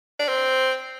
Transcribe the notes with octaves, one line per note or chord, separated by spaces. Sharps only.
D4
C4